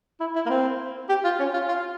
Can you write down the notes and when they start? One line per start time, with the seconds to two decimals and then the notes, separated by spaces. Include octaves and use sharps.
0.20 E4
0.35 E4
0.46 A#3
0.50 C4
1.09 G4
1.24 F4
1.39 C#4
1.54 F4
1.69 F4